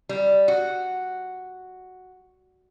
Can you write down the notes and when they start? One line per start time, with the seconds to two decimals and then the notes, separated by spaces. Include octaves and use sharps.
0.09 G3
0.48 F#4